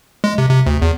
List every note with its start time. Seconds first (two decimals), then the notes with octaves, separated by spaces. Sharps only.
0.24 G#3
0.38 C3
0.50 C3
0.66 D2
0.82 E2